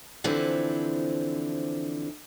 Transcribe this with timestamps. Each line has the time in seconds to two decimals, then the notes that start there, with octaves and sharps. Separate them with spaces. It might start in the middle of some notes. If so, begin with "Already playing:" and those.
0.24 D3 E3 F3 C4 E4